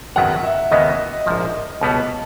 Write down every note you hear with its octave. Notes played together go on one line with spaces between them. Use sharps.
G#1 F#2 D#3 F#3 B3 F#5
E5
D#2 C#3 E3 G#3 B3 D#5
A#1 G#2 F3
C#2 B2 G3 B3 A5